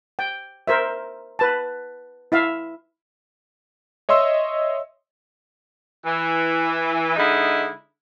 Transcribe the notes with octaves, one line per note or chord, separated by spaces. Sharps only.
G5
A#4 C5 E5
B4 A5
E4 E5 F5
C#5 D#5 E5 C6 E6
E3
D3 G#3 D#4 E4